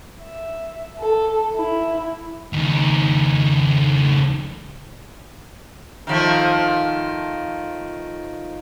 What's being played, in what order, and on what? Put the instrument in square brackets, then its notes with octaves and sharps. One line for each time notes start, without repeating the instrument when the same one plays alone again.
[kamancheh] E5
A4
E4
[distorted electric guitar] C#2 D#3
[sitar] D#3 F3 A3